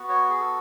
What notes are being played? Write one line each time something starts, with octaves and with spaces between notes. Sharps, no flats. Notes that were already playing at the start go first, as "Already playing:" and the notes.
Already playing: B3 F#4
C#5
G#4
A4